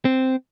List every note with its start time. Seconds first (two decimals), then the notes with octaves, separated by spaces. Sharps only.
0.05 C4